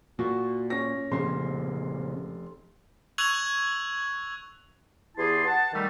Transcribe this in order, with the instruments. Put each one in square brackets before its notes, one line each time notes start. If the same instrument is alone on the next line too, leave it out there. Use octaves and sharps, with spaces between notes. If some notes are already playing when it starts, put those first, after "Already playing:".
[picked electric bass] A#2 [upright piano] F#4
[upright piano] C#4 A#6
[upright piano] F1 C6 [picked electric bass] A#2 C#3
[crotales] C#6 E6 F#6 G#6 F7 F#7
[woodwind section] E2 E4 G4 G#4 A5 C6
F#5 A5
D#3 G3 A3